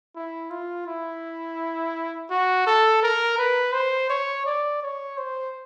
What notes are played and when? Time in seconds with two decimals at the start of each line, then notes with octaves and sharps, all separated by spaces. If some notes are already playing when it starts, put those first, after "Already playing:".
0.15 E4
0.50 F4
0.87 E4
2.30 F#4
2.67 A4
3.03 A#4
3.38 B4
3.74 C5
4.10 C#5
4.46 D5
4.82 C#5
5.17 C5